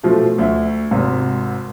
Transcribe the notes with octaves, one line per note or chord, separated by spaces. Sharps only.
B2 F3 A3
D2 E5
G#1 G#2 C3